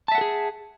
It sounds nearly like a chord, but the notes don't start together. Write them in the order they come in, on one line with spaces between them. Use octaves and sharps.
A5 E5 F#5 A4 G#4